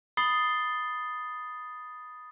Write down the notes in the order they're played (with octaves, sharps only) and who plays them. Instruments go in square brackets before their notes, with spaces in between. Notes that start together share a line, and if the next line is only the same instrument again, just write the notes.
[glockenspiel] B5 D#6 A6 C7 G7